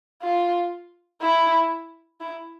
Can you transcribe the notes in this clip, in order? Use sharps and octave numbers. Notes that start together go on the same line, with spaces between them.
F4
E4
E4